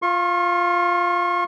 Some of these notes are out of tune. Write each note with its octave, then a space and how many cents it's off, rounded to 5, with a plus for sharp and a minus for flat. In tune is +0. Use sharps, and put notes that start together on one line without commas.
F4 +0 C#6 -45